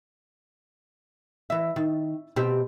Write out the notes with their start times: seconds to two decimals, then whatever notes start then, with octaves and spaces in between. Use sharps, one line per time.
1.50 E3 E5
1.76 D#3
2.36 B2 C4 G4